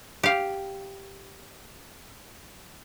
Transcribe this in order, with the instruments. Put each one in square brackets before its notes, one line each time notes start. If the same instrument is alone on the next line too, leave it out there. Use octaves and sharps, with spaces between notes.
[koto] G4 F5